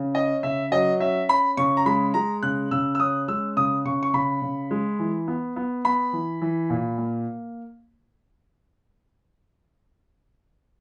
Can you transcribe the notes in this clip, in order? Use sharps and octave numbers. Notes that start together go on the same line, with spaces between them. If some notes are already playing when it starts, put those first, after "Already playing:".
Already playing: C#3
C#4 D#5
C#3 E5
F#3 D#5
C#4 E5
C#4 B5
C#3 C#6
A#5
G#3 B5
G#3 A#5
C#3 F#6
C#3 E6
E6
C#4 D#6
G#3 E6
C#3 D#6
C#3 C#6
C#6
C#3 B5
C#3
G#3
E3
B3
B3
B3 B5
E3
E3
A#2
A#3